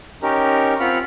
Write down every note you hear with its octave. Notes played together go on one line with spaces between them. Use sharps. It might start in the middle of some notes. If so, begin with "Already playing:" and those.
C#4 D#4 G4 A#4
C4 F4 F#5 B5 F6